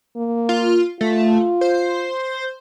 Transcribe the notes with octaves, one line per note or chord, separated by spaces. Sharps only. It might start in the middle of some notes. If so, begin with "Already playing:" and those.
A#3
F4
A3 F4
C5